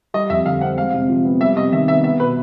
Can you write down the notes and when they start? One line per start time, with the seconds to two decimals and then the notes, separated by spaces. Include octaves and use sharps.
0.14 G3 D#5
0.30 F2 E5
0.46 D3 F5
0.61 C4 F#5
0.78 G#3 F5
0.94 C3
1.09 F3
1.25 B3
1.41 G3 E5
1.57 C3 D#5
1.73 D#3 E5
1.88 B3 E5
2.04 B3 E5
2.20 B2 B4